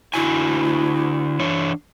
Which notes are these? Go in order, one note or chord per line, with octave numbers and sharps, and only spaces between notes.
D3 E4 F#4 G#5
E3 D4 C#5